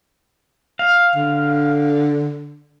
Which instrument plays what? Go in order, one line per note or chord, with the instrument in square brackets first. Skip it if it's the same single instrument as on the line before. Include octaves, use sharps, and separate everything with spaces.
[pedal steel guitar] F5
[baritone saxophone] D3